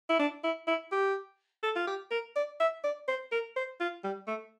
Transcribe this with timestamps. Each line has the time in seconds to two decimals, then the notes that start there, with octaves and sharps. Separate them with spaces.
0.09 E4
0.19 D4
0.44 E4
0.68 E4
0.92 G4
1.63 A4
1.76 F4
1.87 G4
2.11 A#4
2.36 D5
2.60 E5
2.84 D5
3.08 C5
3.32 A#4
3.56 C5
3.80 F4
4.04 G3
4.27 A3